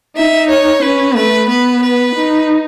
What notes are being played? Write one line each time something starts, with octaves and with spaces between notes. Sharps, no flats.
D#4 E5
C#5
C#4 B4
A3 B4
B3 B4
B4
D#4